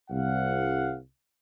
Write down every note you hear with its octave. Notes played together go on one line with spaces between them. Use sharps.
C2 F5 F#5